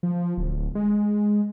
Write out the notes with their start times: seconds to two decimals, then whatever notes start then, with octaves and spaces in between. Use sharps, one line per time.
0.03 F3
0.38 D1
0.75 G#3